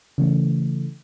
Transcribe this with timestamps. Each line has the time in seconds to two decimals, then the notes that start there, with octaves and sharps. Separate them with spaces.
0.18 C#3 E3 A3